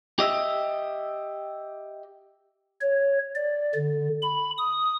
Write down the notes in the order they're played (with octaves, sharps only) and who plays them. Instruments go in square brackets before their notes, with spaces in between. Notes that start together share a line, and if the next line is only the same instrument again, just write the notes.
[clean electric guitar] G4 D#5 E5
[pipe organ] C#5
D5
D3
B5
D#6